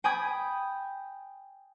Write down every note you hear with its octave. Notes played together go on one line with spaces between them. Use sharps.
G5 G#5 B5 D#6 G#6